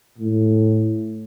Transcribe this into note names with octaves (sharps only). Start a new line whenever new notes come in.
A2